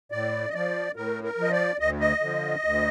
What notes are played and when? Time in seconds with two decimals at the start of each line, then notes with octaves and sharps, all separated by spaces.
0.11 A2 D5
0.49 D#5
0.54 F3 D5
0.96 A2 A#4
1.24 A#4
1.38 F3 D#5
1.52 D5
1.79 D2 D#5
2.00 D#5
2.21 D3 F3
2.64 D2